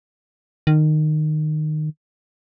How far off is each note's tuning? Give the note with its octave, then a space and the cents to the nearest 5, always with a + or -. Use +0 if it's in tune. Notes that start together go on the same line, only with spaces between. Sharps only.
D#3 -20